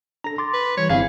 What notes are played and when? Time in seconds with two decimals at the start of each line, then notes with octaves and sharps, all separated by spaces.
0.24 D4 A4 A#5 A#6
0.38 C6 D6 A6
0.54 B4
0.77 E3 G3 C#5
0.89 G1 C4 E4 G#4 F5